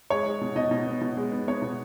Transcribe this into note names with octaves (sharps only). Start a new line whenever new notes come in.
G#3 C#5
G#3
B2
B2 D#5
B2
B3
B2
G#3
B3
B3 C#5
B2